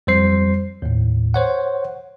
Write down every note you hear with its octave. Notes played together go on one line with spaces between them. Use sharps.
F2 G3 C5 C7
D#2 A2
C5 C#5 F#5